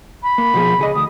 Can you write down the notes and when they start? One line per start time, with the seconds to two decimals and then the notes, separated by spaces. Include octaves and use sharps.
0.23 B5
0.38 A#3
0.54 B2 F3 G#4
0.79 C#3 G#4 D#5
0.95 D2 D#6